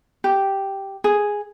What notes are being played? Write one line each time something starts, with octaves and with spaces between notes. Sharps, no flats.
G4
G#4